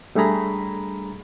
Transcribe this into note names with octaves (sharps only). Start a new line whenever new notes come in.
G3 A3 D4 G#4 A#5 B5